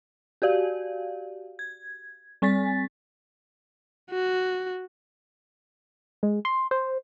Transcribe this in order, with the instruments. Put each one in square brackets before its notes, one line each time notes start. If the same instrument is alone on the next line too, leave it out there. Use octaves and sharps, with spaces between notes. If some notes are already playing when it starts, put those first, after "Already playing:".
[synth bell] F#4 G4 D5 F5
G#6
G3 C4 G#5 A6 B6
[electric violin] F#4
[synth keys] G#3
C6
C5